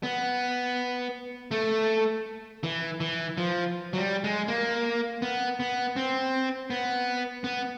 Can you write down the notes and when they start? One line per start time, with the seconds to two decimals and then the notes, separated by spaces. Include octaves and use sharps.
0.03 B3
1.51 A3
2.63 E3
3.00 E3
3.38 F3
3.93 F#3
3.98 G3
4.24 G#3
4.48 A#3
5.22 B3
5.60 B3
5.96 C4
6.70 B3
7.44 B3